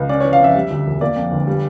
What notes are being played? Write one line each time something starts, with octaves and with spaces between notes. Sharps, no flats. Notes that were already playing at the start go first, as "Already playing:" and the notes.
Already playing: C#2
C#4 D5
E3 C#5
F5
F2 E5
G3
D2
E1
A#3 D5
F2
G1
G3